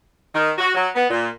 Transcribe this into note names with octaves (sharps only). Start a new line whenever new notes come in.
D#3
F#4
F#3
B3
A#2